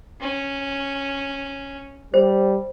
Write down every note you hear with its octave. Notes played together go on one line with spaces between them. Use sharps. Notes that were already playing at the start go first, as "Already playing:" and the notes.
C#4
G3 C5